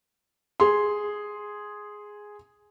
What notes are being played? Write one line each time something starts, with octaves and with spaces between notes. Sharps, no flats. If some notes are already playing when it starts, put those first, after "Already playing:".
G#4 C6